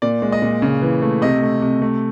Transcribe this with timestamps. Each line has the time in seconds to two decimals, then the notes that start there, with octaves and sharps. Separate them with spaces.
0.02 A#2 D5
0.22 G#3
0.32 D#5
0.42 A#2
0.62 C#3
0.82 E3
1.02 A3
1.22 C3 D#5
1.42 A3
1.61 C3
1.82 A3